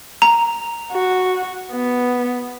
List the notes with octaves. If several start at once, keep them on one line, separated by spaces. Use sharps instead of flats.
A#5
F#4
B3